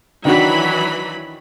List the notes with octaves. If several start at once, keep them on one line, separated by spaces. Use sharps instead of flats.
D#3 E3 F#3 D4 F#4 B5